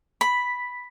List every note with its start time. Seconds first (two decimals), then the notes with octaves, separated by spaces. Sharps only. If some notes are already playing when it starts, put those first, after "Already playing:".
0.21 B5 B6